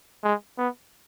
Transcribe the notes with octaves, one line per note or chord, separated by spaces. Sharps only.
G#3
B3